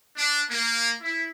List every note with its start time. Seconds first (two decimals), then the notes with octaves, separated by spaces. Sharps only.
0.16 D4
0.49 A#3
1.02 E4